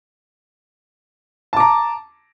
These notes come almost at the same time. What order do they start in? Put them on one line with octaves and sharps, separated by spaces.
A5 D6 A#5